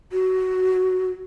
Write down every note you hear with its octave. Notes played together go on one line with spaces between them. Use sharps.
F#4